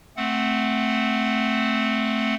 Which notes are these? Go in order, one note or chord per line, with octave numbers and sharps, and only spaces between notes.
A3 C4 F#5